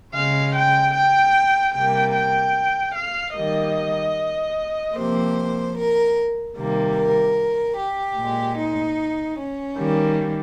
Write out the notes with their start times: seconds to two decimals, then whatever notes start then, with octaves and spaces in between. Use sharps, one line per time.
0.15 C#3 G#3 F5
0.55 G5
0.96 G5
1.76 C3 G3 A#3 G5
2.16 G5
2.96 F5
3.36 D#3 G3 A#3 D#5
4.96 C3 F3 A#3 C5
5.77 A#4
6.57 C3 D#3 G3 A#3
6.97 A#4
7.78 G4
8.18 A#2 G#3
8.58 D#4
9.38 C#4
9.78 D#3 G3 A#3